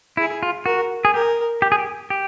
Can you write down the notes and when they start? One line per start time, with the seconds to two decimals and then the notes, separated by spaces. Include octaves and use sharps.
0.17 E4 G#4
0.43 F4
0.66 F#4 A#4
1.05 G#4
1.14 G4 A#4
1.62 G4
1.72 G#4
1.78 G4
2.10 G4